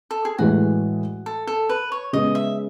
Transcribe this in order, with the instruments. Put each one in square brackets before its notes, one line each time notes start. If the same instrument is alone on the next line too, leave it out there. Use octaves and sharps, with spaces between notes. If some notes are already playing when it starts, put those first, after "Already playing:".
[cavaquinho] A4
G#4
[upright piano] A2 E3 G#3 [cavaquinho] F#4
[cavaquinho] A4
A4
B4
C#5
[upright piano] C#3 G#3 B3 [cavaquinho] D#5
[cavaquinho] E5